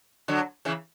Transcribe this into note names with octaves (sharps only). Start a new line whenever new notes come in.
D3 F#3
C#3 E3